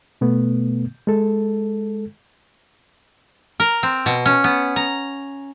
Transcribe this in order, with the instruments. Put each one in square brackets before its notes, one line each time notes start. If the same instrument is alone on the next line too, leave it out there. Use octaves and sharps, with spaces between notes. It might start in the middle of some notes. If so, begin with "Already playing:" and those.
[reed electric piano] B2 A3 B3
G#3 A4
[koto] A#4
C4
B2
C#4
B3
A#5